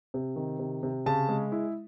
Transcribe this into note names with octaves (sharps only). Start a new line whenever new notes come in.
C3
D#3
C3
C3
C#3 A5
G#3
E4